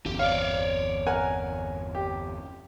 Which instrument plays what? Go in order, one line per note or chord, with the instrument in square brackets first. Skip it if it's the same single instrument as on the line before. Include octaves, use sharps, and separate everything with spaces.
[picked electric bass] G1 E2 [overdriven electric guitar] G4
[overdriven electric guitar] C#5 D5 [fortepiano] F5
[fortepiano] A#4 F#5 G#5
G4